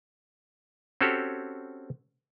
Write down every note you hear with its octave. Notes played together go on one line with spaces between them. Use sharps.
C4 C#4 F#4 G4 A4 C#5